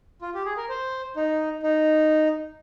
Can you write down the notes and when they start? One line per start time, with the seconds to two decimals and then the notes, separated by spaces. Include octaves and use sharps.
0.22 F4
0.35 G4
0.45 G#4
0.57 A#4
0.69 C5
1.16 D#4
1.63 D#4